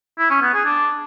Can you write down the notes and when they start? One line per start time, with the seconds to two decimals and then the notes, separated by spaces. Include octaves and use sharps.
0.18 E4
0.30 C#4
0.42 B3
0.53 G#4
0.65 D4